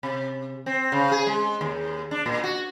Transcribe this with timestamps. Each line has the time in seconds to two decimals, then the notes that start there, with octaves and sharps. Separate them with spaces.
0.03 C3
0.66 C4
0.92 C#3
1.11 G#4
1.27 G#3
1.61 D#2
2.11 D4
2.26 A#2
2.44 F#4